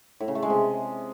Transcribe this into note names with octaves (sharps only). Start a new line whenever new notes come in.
A2
C#3
A3
G#3
C3